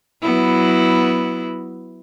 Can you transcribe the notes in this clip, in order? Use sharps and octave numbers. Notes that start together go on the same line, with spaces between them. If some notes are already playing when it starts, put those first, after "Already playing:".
F#3 B3 E4